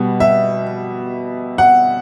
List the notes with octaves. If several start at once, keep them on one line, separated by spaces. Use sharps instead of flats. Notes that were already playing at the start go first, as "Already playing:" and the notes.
Already playing: B2 G3
E5
F#5